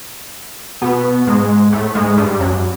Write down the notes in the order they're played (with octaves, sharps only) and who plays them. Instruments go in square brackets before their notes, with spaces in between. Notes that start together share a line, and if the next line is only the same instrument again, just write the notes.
[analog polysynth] B2 B3
G#2 G#3
A2 A3
G#2 G#3
G2 G3
F#2 F#3